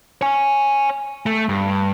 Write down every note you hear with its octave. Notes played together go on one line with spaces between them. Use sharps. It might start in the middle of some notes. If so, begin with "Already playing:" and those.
C#5 G#5
A3
G2